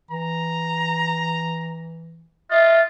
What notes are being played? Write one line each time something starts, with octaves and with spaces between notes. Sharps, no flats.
E3 A#5
F4 D#5 E5